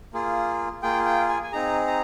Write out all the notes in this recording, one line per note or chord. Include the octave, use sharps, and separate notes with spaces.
A#3 F4 G#4
A#3 F4 G#4 G5
G5
G#5
G#5
C4 D#4 G#4 A#5
A#5